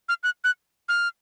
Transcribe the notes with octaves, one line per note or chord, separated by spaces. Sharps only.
F6
F#6
F#6
F6